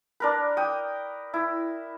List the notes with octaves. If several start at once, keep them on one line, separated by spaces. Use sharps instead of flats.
D4 A#4 B4
G5 D#6
E4